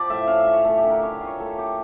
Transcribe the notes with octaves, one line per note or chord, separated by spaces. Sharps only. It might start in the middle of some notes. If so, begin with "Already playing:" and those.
Already playing: F3 G4 D5
A2 E5
C#4 F5
E5
F4
C#5
A3 A4
G4
D3
A#4
C#4 C#5
F4
C#5
A3 A4
D3 G4